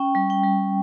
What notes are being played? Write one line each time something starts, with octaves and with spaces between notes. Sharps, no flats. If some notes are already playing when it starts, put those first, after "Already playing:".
Already playing: C#4 G5
G3
G5
G3